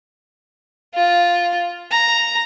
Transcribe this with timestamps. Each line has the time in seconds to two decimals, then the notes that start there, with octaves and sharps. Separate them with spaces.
0.95 F4
1.92 A#5